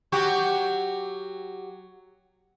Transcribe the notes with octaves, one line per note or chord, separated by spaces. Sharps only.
F#3 F#4 G4